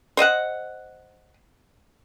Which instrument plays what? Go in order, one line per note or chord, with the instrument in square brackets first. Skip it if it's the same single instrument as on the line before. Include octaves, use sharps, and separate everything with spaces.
[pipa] C5 D#5 E5 F#5